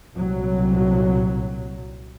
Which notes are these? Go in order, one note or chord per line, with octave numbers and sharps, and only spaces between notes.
C2 A#2 F#3